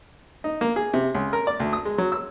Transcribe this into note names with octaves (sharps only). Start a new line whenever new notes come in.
D#4
A#3
G#4
C3
C#2
A#4
D5
D2
D#6
G#3
F#3
E6